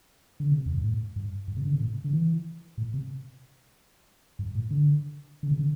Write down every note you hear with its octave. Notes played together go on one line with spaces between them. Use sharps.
D3
C3
E2
G2
A2
G2
G2
C3
D3
C3
A2
D3
E3
A2
C3
G2
A2
D3
D3
C3
D3